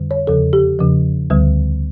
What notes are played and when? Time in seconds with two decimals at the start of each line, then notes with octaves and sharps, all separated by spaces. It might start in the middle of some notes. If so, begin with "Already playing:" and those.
Already playing: F2 D3 G3
0.11 C#5
0.27 E2 C#3 F3 A4
0.53 G4
0.79 E2 C#3 F3
1.30 D2 D3 G3